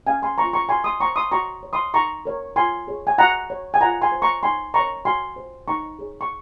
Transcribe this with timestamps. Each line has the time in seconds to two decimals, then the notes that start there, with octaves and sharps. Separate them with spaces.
0.07 C#4 F5 G#5
0.22 G#5 C6
0.38 F4 C5 A#5 C#6
0.53 A#5 C#6
0.69 F#4 G#5 C6
0.84 C6 D#6
1.00 C5 A#5 C#6
1.16 C6 D#6
1.31 F#4 A#5 C#6
1.63 C#5
1.73 C6 D#6
1.94 D#4 A#5 C#6
2.25 A#4 C#5
2.56 F4 G#5 C6
2.87 G#4 C#5
3.07 G#5
3.18 F#4 F#5 A#5
3.50 C#5
3.74 G#5
3.81 F4 F#5 A#5
4.02 G#5 C6
4.12 C5
4.22 A#5 C#6
4.43 D#4 G#5 C6
4.74 A#4 C#5 A#5 C#6
5.05 F#4 G#5 C6
5.36 C5
5.68 D#4 A#5 C#6
5.99 G#4 C#5
6.21 C#6